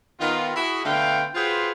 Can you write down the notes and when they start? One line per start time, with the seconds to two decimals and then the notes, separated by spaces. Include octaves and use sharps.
0.21 D#3 B3 F4
0.56 E4 F#4 G#4
0.85 D3 A3 B3 F5 G5
1.35 F4 F#4 G#4 B4 C5 G5